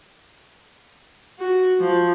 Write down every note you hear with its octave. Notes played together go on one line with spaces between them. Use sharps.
F#4
F3